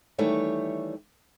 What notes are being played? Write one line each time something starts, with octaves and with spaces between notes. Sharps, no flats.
D#3 E3 G3 A3 C#5